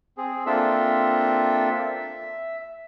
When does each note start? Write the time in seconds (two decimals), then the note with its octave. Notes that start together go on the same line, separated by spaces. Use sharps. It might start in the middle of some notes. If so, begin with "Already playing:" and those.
0.18 C4 G#4
0.46 A#3 C4 D4 F4 A4 E5
1.82 E5